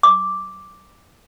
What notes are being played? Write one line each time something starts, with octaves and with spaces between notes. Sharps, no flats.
D6